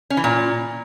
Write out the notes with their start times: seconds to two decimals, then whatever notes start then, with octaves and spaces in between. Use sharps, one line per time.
0.10 C#4
0.17 E3
0.24 A#2